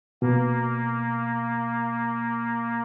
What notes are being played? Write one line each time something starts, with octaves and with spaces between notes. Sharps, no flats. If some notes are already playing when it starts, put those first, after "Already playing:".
B2 A#3